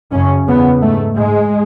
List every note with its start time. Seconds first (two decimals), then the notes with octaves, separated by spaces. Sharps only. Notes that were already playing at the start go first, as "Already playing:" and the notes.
0.12 F#2 C#3 C#4
0.47 E2 C#3 B3
0.82 G#2 A3
1.17 G#2 G#3